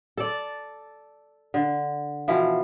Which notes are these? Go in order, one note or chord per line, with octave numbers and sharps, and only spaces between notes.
A4 D5
D3
B2 E3 F3